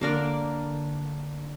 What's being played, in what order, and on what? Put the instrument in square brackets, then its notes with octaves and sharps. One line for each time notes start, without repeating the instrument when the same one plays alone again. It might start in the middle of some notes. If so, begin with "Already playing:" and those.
[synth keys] D3 [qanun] A#3 D4 A#4 D5